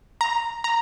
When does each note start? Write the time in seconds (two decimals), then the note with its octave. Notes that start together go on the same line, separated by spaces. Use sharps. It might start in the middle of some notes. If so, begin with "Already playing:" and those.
0.21 A#5
0.64 A#5